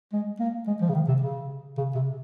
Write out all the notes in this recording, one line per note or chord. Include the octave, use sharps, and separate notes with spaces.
G#3
A#3
G#3
F3
C#3
D#3
C3
C#3
C#3
C3